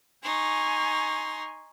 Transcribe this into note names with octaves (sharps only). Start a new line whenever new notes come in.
D#4 G#5 C6 C#6